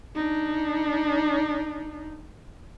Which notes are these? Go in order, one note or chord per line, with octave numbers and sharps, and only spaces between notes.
D4 D#4